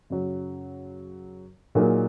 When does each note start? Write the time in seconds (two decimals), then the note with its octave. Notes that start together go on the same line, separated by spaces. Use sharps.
0.10 F#2 C#3 F#3
1.75 A#2 F#3 A#3 D#4 G#4